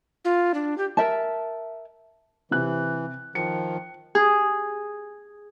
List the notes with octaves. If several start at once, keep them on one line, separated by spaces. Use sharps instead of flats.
F4
D4
G4
A#4 E5 A5
C3 E3 F#6
D#3 F3 C#7
G#4